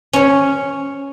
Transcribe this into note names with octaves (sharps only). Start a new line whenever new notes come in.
C#4 C#5